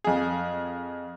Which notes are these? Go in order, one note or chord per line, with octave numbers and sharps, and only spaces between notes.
F2 G#4